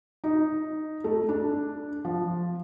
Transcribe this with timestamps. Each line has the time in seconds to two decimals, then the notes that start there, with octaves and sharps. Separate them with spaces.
0.24 D#4
1.04 A3
1.29 D4
2.05 F3